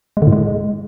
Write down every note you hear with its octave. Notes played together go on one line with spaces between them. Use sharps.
G#3
D3
A2
G#3